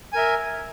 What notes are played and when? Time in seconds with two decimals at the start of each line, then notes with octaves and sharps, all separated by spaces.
0.13 G#5
0.15 A#4
0.18 E5